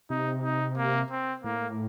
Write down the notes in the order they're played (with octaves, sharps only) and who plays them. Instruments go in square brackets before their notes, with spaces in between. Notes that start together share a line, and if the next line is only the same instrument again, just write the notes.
[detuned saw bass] C3 [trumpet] D#4
[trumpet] D#4
A#3
C4
[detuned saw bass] A2 [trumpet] A#3